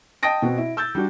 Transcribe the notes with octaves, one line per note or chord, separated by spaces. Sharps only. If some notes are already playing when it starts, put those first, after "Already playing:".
D#5 G5 A5 D#6 A#6 D7
B2 B3 C4 F#4
E4
E6 G6 A6
G3 D4 F#4